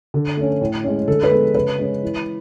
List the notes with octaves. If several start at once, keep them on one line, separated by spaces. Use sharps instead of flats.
D3
A3 C#4
A2
G#3 C#4
D3 A4
B4
G#3 B3 A4
C#3 B4
G#3 C#4
E3